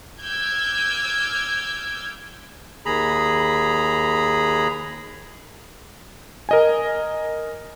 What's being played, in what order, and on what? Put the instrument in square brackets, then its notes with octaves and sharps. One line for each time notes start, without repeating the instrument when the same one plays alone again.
[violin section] D6 E6 F6 G6 G#6
[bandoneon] D#2 G#4 A#5 B5
[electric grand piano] A#4 D#5 G#5